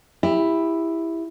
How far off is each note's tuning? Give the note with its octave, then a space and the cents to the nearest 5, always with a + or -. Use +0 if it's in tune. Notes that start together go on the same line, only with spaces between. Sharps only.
E4 +0 G4 +20